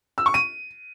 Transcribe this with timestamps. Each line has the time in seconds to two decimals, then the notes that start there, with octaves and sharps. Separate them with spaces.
0.18 E6
0.26 C#6
0.34 D#7